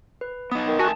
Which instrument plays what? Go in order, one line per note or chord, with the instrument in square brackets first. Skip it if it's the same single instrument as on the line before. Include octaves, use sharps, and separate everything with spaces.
[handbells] B4
[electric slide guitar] B3 D#4 [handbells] D#6
[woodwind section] D#3
[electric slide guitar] A3 G#5 [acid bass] F#4 [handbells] A5